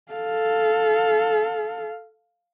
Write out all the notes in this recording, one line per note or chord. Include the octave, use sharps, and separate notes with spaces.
A4 F5